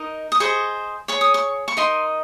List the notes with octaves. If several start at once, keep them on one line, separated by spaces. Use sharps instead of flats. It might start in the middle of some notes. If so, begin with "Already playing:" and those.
Already playing: D#4 A#4 D#5
D#6
G#4 C5 D#5 C#6
G#4 C#5 C#6
D#6
C#6
C#6
D#4 A#4 D#5 C6